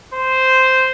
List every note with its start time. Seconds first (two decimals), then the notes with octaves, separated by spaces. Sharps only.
0.14 C5